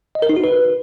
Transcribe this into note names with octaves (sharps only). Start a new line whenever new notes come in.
D#5
A#4
D#4
F#4
B4